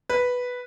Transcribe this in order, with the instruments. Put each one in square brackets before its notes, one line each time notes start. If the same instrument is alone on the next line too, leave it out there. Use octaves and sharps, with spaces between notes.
[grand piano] B4